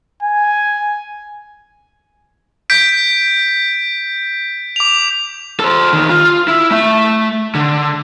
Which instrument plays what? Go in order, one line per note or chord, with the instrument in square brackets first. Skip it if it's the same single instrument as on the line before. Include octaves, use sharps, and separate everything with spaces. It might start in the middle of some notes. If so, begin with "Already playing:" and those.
[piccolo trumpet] G#5
[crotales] G6 B6 D7
D6 F7
[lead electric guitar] A4 C5
E2 D#3
F4
E4
A3 E5
D3